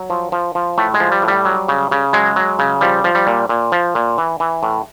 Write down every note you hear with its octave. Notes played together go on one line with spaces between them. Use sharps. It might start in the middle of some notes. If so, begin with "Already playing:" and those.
Already playing: F#3
F3
F3
F3
A2 A3
G#3
F3
G3
A2
G3
F#3
C#3
C#3
F#3 G#3
F#3
C#3
F3 G3
F3
G3
A#2
A#2
F3
A#2
E3
E3
A2